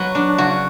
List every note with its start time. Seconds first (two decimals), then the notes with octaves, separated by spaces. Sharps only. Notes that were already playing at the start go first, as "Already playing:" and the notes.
Already playing: F#3 B3 F#4 B4
0.15 D4
0.38 C#3 F#4